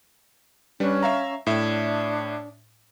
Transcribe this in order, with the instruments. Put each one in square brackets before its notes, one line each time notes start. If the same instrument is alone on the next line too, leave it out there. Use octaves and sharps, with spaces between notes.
[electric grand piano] G3 D4 B4 [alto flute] C#4
[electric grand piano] E5 F5 A#5
[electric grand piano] A2 E5 [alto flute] D4